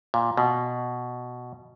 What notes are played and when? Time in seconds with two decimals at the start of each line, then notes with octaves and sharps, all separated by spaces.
0.14 A#2
0.37 B2